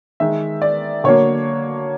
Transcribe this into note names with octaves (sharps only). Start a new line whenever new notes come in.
D#3 G#3 E5
D5
D3 F#3 A#3 C#5